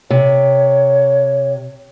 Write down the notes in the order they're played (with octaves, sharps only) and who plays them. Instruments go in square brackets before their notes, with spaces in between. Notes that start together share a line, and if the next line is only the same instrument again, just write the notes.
[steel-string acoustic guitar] C3 [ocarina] C#5